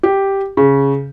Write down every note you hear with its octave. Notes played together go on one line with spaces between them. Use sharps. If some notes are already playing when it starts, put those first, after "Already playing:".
G4
C#3